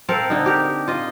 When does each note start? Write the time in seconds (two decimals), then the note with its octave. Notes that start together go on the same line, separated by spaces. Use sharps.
0.09 C4 A4 A#4 F5
0.30 D3 D#4
0.46 G4 A#4
0.88 F4 D#5